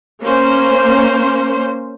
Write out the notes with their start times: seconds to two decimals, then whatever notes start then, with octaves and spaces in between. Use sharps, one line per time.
0.22 A#3 C#4 C5